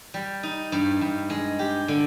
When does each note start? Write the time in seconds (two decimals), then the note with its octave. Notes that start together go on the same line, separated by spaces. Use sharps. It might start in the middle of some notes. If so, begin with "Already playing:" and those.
0.14 G3
0.43 D#4
0.72 G2
1.01 G2
1.30 G#3
1.59 G4
1.88 D3